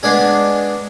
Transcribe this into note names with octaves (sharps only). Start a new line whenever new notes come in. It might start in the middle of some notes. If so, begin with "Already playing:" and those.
G#3 B3 D4 G#4